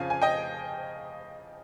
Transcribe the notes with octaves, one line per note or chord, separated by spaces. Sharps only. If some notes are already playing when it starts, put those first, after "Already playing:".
Already playing: F2 C#3 F3 F5 G#5
G#5
D#5 G5